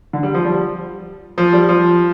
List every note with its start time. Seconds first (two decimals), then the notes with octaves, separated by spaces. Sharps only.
0.13 D3
0.23 G3
0.34 F3
0.45 G3
1.38 F3
1.53 G3
1.69 F3